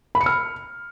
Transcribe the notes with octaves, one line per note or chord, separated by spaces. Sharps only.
B5
C#7
F6